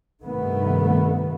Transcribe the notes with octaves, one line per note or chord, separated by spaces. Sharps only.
G2 C3 D#3 A3 B3